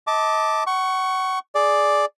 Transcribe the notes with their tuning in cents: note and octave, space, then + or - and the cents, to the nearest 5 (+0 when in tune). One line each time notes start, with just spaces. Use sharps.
D#5 +35 A5 +0 D6 +0
F#5 +30 C#6 +0
G#4 +15 D5 +0